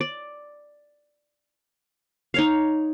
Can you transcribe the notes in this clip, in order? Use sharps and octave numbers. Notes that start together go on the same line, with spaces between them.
D5
D#4 C#5 F5